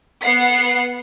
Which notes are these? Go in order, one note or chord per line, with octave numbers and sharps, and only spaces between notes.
B3 F#5 C7